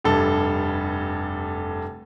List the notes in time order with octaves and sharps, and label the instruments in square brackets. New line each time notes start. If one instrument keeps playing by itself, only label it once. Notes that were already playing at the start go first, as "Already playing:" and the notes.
[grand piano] F1 G2 A4